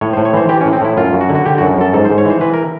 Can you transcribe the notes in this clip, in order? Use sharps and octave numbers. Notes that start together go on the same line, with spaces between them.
A2 C#5
C5
A2
C#5
E3 C5
E3 G4
C#4
A2
C4
A2 E4
F#2 F4
F#2
F#4
D3
F#4
D3 G4
F#2 F#4
F#2 A4
G#2 A4
C5
G#2
C#5
E3
C5
E3 B4
A#4